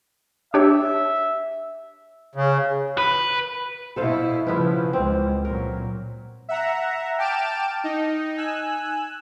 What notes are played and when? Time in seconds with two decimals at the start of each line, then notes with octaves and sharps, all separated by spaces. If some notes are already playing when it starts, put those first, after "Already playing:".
0.54 D4 G4 C#5 E5
2.35 C#3
2.98 B4
3.96 B2 E4 A4 C5 F5
4.47 C#3 F3 B3 E4 B4
4.93 C#2 G#3 C4
5.45 A#2 F#3 A#4
6.49 E5 F#5 A#5
7.18 G5 A5 D6 F6 D7 E7
7.84 D#4
8.37 G#5 E6 F#6